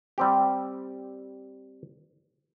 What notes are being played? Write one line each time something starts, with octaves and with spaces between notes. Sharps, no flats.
G3 C4 G4